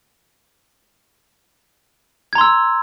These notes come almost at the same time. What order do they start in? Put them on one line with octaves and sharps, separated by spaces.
G#6 A#5 C6 E6